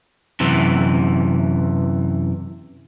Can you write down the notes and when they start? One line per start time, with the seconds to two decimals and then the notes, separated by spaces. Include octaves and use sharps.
0.40 F#2 C3 E3